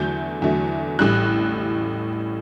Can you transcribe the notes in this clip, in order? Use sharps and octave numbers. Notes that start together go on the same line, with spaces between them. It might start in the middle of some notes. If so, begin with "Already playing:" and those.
Already playing: E2 D3 F#3 A3 G6
E2 D3 F#3 A3
A1 A2 G3 F#6